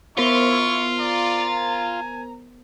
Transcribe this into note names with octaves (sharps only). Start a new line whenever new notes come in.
B3 E4 F4 A#4 C5 C#6
D5 A#5
G#5